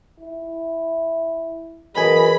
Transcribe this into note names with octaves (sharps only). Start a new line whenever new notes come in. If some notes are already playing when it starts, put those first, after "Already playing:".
E4
F#2 E3 G#4 A4 B4 D#5 G#5 B5